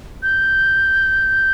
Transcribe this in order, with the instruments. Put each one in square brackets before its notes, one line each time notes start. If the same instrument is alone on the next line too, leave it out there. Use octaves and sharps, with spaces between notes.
[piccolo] G6